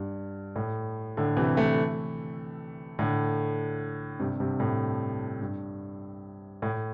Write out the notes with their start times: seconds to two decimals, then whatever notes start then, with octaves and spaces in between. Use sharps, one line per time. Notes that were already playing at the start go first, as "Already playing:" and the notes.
Already playing: G2
0.56 A2
1.17 A2 D3
1.37 C3 E3
1.57 E3 A3
2.99 A2 D3
4.20 G2 C3
4.40 G2 C3
4.60 A2
5.41 G2
6.62 A2